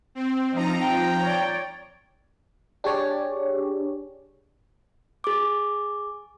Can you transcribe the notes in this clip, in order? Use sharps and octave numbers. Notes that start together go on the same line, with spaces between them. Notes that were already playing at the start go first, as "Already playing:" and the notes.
C4
F3 C4 D#4 A#5
G5
C#5 D5
D4 G4 G#4 C#5 D5
G#4 D6